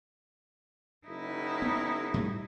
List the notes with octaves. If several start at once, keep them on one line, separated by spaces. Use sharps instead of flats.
F#1 D#4 E4
B3
A2 G3